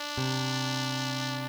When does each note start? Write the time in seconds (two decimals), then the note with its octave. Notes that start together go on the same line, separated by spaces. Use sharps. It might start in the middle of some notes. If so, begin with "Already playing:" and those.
Already playing: D4
0.18 C3